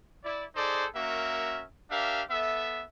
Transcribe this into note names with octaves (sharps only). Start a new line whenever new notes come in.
E4 D5
D#4 G#4 A4 C5 D5
A#3 C#4 F#4 A#4 E5
D4 G4 A#4 E5 F5
B3 A4 E5